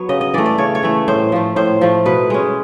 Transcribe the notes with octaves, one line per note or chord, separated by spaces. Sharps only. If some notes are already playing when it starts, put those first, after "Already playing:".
Already playing: F#3 B3 C#5
C#3 D#5
D#5
E3 A3 D5
D5
C#3 C#5
C#5
E3 A3
A2 C5
F3 A3
A2 C5
F3 A3
B2 B4
G#3 C#4